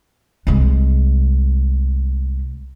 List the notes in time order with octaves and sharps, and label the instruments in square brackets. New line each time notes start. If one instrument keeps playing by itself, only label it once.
[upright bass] C2 G#3